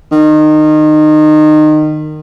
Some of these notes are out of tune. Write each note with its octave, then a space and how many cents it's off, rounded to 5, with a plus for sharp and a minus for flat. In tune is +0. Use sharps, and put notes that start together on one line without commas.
D#3 -25